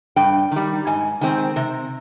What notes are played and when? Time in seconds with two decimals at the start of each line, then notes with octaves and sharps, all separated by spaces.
0.16 G2 G5
0.51 D#3 G3
0.87 G#2 G#5
1.21 D#3 G#3 C4
1.56 C3